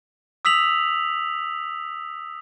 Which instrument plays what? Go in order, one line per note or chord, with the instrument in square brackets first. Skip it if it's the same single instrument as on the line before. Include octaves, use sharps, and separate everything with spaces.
[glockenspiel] D#6 E6 B6 F7 F#7